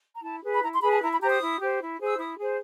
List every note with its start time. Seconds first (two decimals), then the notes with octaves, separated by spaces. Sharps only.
0.14 A#5
0.23 E4 A5
0.43 G#4 B4
0.55 B5
0.62 E4 A#5
0.72 C6
0.82 G#4 B4 B5
0.91 A5
1.01 E4 A#5
1.11 B5
1.21 G4 C5 A#5
1.30 D#6
1.40 E4
1.59 G4 C5
1.79 E4
1.99 G#4 C5
2.06 E6
2.18 E4 D#6
2.38 G#4 C5